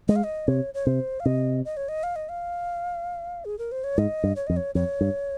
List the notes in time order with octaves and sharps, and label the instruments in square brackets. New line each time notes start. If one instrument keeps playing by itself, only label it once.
[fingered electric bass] G#3 [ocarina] D#5
[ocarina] F5
D#5
[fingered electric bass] C3 [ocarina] C#5
[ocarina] C#5
[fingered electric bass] C3 [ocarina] C5
[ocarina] F5
[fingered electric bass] C3 [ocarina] D#5
[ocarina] D#5
C#5
D#5
F5
D#5
F5
G#4
A#4
C5
C#5
[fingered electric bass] G#2 [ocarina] D#5
[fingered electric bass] G2
[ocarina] C#5
[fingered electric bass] F2 [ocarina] D#5
[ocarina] C#5
[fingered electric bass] F2 [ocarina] C#5
[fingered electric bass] G2